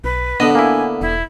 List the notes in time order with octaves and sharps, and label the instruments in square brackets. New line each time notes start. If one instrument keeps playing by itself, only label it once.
[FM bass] B1 [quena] B4
[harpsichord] D3 B3 [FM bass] D4 [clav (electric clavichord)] D#5
[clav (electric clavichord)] A#3 E4 [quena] G#5
[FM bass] E1 [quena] E4